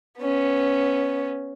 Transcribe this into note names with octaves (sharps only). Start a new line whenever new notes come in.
B3 C#4